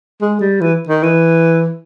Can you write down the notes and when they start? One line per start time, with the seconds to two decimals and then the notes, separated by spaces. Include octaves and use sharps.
0.22 G#3
0.41 G3
0.61 E3
0.88 D#3
1.03 E3